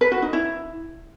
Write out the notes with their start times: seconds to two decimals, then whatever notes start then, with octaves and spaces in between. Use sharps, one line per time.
0.01 B4
0.12 F#4
0.22 D#4
0.33 E4